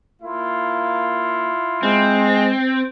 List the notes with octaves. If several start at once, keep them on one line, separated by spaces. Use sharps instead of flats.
A#3 E4 F4
G#3 C4